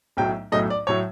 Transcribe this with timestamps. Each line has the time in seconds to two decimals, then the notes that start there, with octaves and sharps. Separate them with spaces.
0.17 B1 A2 F#3 A3 G5
0.52 B1 A2 F#3 A3 D#5
0.70 D5
0.87 A2 F#3 A3 C#5